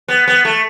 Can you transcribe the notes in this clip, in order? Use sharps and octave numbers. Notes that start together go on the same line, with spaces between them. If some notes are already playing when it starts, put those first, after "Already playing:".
B3
B3
A3